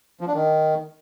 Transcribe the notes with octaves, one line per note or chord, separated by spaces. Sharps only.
F3
D4
D#3